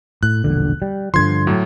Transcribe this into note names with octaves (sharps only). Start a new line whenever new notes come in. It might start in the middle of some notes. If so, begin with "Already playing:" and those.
A2 F#6
E1 A#1 D3
G3
G2 D3 F3 C6 G#6
A2 F#3